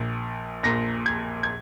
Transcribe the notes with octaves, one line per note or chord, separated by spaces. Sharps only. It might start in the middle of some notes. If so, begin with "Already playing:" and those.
Already playing: A#1 A#2
A#1 A#2 A#6
G#6
G#6